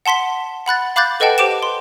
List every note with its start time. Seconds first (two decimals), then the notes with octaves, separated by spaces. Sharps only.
0.06 F#5 A5 C6 B6 G7
0.66 F#5 B5 F#6 A6
0.96 F5 B5 D6 F#6 G6 A6
1.20 A4 B4 D#5 F#5 G5 A5
1.38 G4 C5 D6 D7 E7
1.63 C6